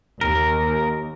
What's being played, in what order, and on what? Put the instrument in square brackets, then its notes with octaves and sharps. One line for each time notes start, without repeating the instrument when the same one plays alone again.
[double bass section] D#2 [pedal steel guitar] A#4